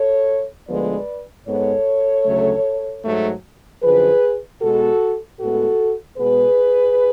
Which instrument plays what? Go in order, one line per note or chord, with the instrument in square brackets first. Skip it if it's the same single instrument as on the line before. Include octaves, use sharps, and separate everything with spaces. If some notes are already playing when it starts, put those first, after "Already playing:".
Already playing: [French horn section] A4 C#5
D2 D3 F3 G#3 B3 B4 D5
G#2 G#3 B3 A4 C#5
D2 C#3 F#3 A3
G#2 F#3 A3
F#2 D3 F3 G#4 B4
B2 G#3 B3 F#4 A4
A2 G#3 B3 F#4 A4
B2 G#3 B3 G#4 B4